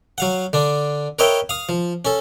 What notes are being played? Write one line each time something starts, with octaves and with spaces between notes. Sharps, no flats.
F#3 F5 F#5
D3 D4
A#4 B4 C#5 D#5 E5 G5
F5 D#6
F3
C#4 A4